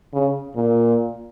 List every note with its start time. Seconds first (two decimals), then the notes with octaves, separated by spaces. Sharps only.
0.13 C#3
0.56 A#2